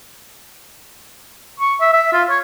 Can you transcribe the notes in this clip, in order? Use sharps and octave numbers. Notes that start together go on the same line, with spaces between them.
C#6
E5
E5
F4
C#5